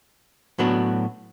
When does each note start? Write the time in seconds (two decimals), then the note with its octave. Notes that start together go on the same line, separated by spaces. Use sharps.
0.59 A2 F#3 B3 D4 F#4